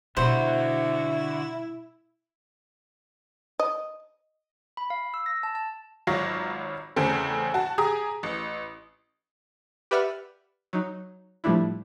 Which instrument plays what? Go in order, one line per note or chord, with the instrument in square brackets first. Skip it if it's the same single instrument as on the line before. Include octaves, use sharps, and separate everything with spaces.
[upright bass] B2 G3 [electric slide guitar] D3 F#4 [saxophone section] E4 [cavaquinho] C5
[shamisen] D#5
[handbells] B5
F5
E6
A#6
A5
A5
[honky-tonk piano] G#1 F#3 F4 C#6 A#6
E2 C#3 A3 C4 A4
F#4 A5
G4 G#4 A#5 D#6
A1
[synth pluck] G4 B4 D5 E5 F#5 F6
F#3 D#4
A2 F3 G3 A3 D4 E4